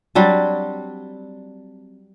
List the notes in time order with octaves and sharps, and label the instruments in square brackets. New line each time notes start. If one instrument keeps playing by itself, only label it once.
[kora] F#3 G3 C4 D4